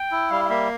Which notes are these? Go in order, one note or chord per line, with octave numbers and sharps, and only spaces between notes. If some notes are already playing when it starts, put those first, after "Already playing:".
Already playing: G5
E4
G3 F5
F5
A#3 E5